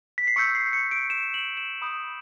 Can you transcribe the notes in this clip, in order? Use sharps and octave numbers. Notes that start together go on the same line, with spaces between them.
B6
C7
C#6 E6 G6 C#7
C7
C#7
D7
E7
F#7
E7
B5 D#6 G6